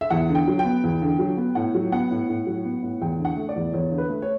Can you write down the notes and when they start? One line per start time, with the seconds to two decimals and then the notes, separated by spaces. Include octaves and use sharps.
0.01 E5
0.10 E2 F#5
0.29 D3
0.35 G5
0.48 F#3
0.59 G5
0.65 B3
0.84 E2
1.02 D3
1.19 F#3
1.37 B3
1.55 A2 F#5
1.75 F#3
1.92 B3 F#5
2.11 A2
2.29 A2
2.47 F#3
2.65 B3
2.83 A2
3.02 E2 G5
3.19 D3
3.25 F#5
3.37 A3
3.49 D5
3.56 E2
3.73 E2 C#5
3.92 D3
3.98 B4
4.10 A3
4.22 C#5